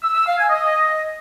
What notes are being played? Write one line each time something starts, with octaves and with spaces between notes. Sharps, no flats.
E6
E6
F5
G#5
D#5